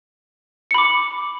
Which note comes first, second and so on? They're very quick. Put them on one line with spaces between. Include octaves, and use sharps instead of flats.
C#7 B5 D6